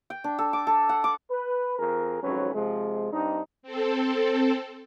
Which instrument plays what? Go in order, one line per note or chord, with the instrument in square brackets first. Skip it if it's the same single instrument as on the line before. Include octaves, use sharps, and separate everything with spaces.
[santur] G5
D4
A4
D6
A4
F#5
D6
[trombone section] B4
F2 G#4 A#4
G#1 F2 F#3 C#4 B4
C3 F3 G#3
G2 C4 D4 D#4
[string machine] C4 A4